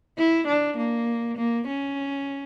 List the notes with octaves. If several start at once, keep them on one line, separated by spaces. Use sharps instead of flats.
E4
D4
A#3
A#3
C#4